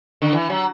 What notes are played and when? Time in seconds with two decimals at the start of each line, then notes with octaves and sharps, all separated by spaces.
0.22 D3
0.33 E3
0.50 F#3